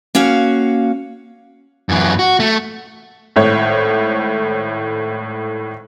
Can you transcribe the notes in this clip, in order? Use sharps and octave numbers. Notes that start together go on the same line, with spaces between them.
A#3 C#4 F#4 F5
F#2 E3
F#4
A3
G#1 A2 C#5